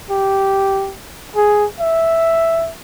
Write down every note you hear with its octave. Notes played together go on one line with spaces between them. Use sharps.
G4
G#4
E5